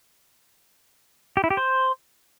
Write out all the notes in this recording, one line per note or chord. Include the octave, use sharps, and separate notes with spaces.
G4
E4
G4
C5